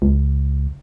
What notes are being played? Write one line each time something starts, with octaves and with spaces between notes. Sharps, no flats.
C#2